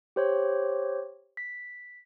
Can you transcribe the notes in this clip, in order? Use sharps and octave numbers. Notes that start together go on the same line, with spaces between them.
G4 C5 C#5
B6